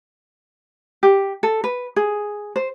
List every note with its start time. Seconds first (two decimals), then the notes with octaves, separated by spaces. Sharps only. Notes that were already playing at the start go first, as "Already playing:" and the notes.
1.03 G4
1.43 A4
1.64 B4
1.96 G#4
2.56 C5